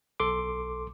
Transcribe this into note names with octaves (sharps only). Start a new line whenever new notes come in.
B1 A4 C6 D6